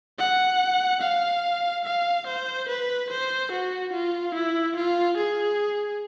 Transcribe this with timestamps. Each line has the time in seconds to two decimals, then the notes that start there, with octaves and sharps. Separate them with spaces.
0.19 F#5
1.01 F5
1.85 F5
2.27 C5
2.68 B4
3.10 C5
3.51 F#4
3.93 F4
4.35 E4
4.76 F4
5.17 G#4